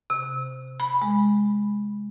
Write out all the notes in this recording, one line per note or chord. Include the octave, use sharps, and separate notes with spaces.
C3
B5
G#3